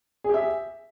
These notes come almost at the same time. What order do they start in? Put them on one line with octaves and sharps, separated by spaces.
G#4 G4 E5